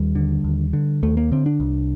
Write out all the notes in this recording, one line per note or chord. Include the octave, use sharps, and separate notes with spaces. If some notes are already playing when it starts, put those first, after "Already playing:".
Already playing: D#2 G3
D3
D#2
D3
D#2 A3
A#3
D3 C4
D4
C2